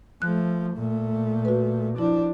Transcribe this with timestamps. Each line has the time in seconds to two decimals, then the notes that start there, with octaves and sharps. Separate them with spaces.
0.22 F3 A3 F#6
0.77 A#2 A3
1.45 F#4 B4
1.98 F3 D4 E4